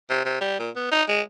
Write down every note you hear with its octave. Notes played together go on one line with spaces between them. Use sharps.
C3
C3
G3
A#2
B3
D#4
G#3